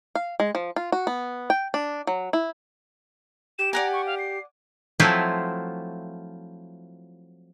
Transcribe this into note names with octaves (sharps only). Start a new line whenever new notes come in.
F5
G#3
F3
F4
F#4
B3
G5
D4
F#3
E4
G4 E7
D5 F#5 G#5 A#5
C#6
F5
C7
F3 F#3 A3 C4 E4 F4